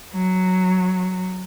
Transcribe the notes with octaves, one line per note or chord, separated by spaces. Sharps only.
F#3